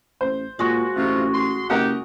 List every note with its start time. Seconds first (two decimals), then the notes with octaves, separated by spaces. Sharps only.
0.21 A1 C5
0.59 A#2 G#3 F#4
0.96 A1 C3 F4
1.34 C6
1.70 F#1 G4 A#4 D#5 F#5